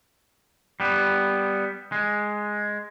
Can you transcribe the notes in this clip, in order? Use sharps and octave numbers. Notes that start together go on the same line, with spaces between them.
G3 B3
G#3